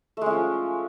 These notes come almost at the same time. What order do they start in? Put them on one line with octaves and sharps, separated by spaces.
A3 G#3 C#4 F3